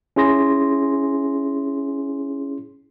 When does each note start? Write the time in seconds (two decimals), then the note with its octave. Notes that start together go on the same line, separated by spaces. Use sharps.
0.16 C#4 E4 G#4 C6 A#6